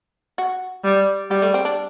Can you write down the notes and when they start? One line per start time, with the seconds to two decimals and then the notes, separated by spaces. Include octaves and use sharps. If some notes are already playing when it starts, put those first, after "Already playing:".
0.38 F#4
0.84 G3
1.31 G3 G4
1.42 A3
1.54 C4
1.65 D4